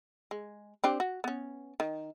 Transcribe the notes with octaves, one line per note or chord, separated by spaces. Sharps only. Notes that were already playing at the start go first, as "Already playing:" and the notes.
G#3
C4 D4 G4
F#4
B3 C#4
D#3